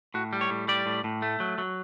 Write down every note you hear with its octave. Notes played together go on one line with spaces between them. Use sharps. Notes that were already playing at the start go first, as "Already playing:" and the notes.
A2 F#4
G3
C#5
A2
G3 D5
A2
A2
A3
F#3
F#3